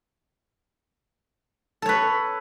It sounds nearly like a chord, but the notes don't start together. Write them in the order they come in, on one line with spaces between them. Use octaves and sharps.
A4 C#5 B4